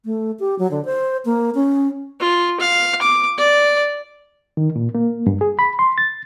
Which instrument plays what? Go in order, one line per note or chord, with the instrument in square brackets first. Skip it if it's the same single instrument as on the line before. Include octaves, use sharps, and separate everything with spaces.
[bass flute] A3
G4
F#3
D3
C5
A#3
C#4
[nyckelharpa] F4
F5
D6
D5
[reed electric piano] D#3
A#2
A#3
G2
G#4
B5
C6
A6